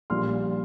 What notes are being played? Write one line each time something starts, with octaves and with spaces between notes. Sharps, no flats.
A#1 A#2 G3 C6 F6